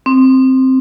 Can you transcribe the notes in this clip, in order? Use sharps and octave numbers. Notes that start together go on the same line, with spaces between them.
C4